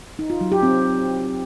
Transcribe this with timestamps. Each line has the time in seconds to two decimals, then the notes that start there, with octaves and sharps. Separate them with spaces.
0.19 D#4
0.30 F4
0.41 F#3
0.52 G4
0.63 C4